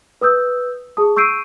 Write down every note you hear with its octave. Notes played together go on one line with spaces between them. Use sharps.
B4 D#6 E6 G6
G#4 A5 D#6
C#6 E6 G6 C7 D7 D#7